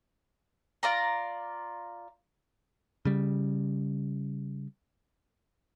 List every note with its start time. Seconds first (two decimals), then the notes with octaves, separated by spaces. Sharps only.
0.83 F4 D5 A#5
3.05 C#3 G3